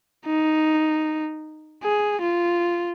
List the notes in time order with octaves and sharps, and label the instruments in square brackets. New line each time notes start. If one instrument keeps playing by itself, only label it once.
[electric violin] D#4
G#4
F4